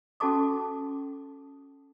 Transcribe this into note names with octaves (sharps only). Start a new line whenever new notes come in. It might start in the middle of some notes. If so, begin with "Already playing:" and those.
C#4 F#4 A4 A5 D6 D#6